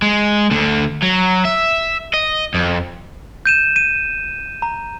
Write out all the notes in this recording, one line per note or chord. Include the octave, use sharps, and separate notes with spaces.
G#3
D2 D3
F#3
E5
D#5
F2
G6 D#7 E7
D#7
A#5